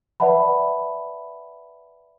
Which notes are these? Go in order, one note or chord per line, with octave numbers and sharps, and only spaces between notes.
B4 D5 E5 F#5 A5 B5